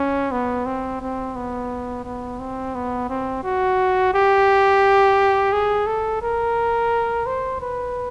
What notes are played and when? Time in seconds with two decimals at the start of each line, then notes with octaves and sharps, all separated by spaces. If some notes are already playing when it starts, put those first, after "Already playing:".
Already playing: C#4
0.32 B3
0.66 C4
1.01 C4
1.36 B3
2.05 B3
2.39 C4
2.75 B3
3.09 C4
3.44 F#4
4.14 G4
5.52 G#4
5.87 A4
6.22 A#4
7.26 C5
7.61 B4